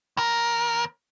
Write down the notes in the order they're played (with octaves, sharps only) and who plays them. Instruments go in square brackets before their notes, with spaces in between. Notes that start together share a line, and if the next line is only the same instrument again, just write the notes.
[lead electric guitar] D#2 A#4